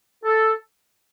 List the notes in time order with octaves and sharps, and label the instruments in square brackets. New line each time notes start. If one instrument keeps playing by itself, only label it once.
[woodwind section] A4